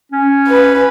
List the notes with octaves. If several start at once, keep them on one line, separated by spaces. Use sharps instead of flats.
C#4
B4